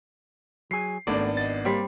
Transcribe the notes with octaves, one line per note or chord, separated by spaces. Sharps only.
F#3 G#4 C7
G#1 A3 B3 D4 D5
D#5 A6
G3 A#3 C4 B6